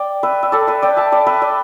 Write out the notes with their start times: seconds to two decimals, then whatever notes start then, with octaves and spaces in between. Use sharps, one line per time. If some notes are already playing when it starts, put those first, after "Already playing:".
Already playing: D5 G5
0.23 B4 E5
0.43 E5
0.52 A4 D5
0.67 B4 E5
0.82 D5 G5
0.97 E5 A5
1.12 D5 G5
1.27 B4 E5
1.42 D5 G5